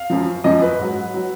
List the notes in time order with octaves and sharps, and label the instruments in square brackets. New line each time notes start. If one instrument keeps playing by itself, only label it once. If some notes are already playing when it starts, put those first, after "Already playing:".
Already playing: [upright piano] F5
F#2 F3
F#2 F3 D#5
B4
G#2 F#3
F#3